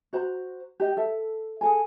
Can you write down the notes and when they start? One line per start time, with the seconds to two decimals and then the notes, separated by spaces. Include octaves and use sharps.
0.13 F#4 C5 A#5
0.80 G4 D#5 G5
0.97 A4 E5
1.61 G#4 A4 G#5